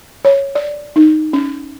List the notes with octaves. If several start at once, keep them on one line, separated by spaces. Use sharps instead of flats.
C#5
D5
D#4
C#4